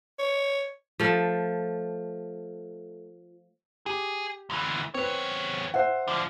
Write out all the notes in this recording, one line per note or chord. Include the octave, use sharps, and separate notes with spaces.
C#5
F3 A3
G4 G#4
D2 E3
E2 C4 B4 C#5
C5 E5 F#5
D3 F3